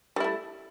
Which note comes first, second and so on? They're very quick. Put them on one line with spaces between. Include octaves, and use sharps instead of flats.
G3 E4 A3